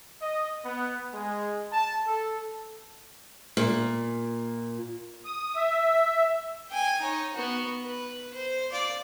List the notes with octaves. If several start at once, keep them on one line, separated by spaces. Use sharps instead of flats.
D#5
B3
G#3
A5
A4
A#2
D#6
E5
G5 G#5
D#4 C#5
B3 F#4
B4
C5
F4 D5